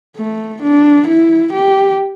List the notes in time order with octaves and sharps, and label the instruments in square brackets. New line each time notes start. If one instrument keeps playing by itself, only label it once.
[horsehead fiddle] A3
D4
E4
G4